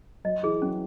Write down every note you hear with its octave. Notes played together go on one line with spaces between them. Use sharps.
F#3 D#5
E3 G#4
F#3 C#4